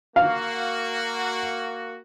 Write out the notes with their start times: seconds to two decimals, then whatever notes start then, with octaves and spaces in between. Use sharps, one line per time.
0.16 A#3 F#4 F5